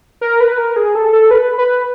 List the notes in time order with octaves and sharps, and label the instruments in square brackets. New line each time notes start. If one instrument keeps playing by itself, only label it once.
[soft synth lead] A#4
B4
A#4
G#4
A4
A4
B4
B4